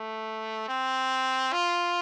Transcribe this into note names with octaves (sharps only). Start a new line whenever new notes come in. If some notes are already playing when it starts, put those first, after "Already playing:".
Already playing: A3
C4
F4